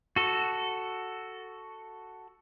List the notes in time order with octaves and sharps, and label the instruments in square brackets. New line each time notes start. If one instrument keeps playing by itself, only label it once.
[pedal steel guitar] F#4 A4